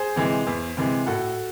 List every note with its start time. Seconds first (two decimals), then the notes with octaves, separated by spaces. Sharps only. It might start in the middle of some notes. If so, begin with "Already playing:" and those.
Already playing: G#4 C5
0.16 C3 E3 G#3
0.47 E2
0.77 C3 E3 G#3
1.07 A2 F#4 A4